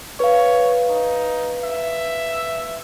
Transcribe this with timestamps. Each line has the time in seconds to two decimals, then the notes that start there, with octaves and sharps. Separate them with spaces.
0.20 B4 C#5 F5
0.90 D#4
1.64 E5